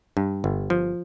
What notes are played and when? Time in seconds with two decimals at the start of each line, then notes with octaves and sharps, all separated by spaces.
0.17 G2
0.44 G1
0.70 F3